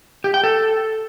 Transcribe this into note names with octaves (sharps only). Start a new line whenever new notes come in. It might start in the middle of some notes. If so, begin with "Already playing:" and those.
G4
G5
A4